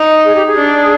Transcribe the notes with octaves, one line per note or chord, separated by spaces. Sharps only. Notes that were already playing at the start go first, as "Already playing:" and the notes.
Already playing: D#4
G#4
G4
G#4
D4